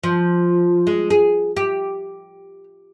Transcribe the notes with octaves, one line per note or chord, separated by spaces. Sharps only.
F3
G#3
G#4
G4